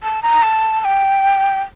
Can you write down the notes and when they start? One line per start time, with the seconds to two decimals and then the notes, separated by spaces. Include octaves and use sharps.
0.03 A5
0.23 A#5
0.43 A5
0.81 A5
0.85 G5